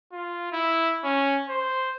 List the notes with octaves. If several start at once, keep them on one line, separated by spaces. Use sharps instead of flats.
F4
E4
C#4
C5